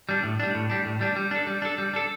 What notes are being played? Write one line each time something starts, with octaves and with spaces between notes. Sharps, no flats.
G3 D4
A2
G3 D4
A2
G3 D4
A2
G3 D4
G3
D4 A4
G3
D4 A4
G3
D4 A4